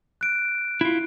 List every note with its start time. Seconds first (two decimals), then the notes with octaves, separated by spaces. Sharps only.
0.21 F#6 D7
0.81 E4 F4